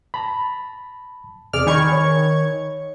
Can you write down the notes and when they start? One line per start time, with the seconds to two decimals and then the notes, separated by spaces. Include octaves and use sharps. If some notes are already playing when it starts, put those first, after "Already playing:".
0.14 A5 B5
1.53 E2 C3 G#4 D5 F6
1.67 D#3 G#5 B5 C#6 G#6
1.92 C#5